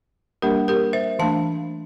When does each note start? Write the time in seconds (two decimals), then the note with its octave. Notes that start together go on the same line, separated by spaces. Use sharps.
0.42 G3 A#3 D4 G4 A#4
0.68 G4 A#4
0.93 C5 E5
1.19 E3 A3 D4 F5 A5